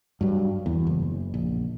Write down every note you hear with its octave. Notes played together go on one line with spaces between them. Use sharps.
G2 F#3
E2
F#1
A#1